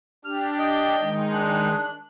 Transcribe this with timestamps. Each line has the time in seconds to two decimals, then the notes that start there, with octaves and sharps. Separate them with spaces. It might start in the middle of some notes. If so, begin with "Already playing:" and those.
0.25 D4 G4 F6
0.59 D#5 G5
1.01 D#3 G#3 D#4
1.33 D4 F#6